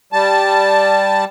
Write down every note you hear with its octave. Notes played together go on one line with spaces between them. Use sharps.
G3 A5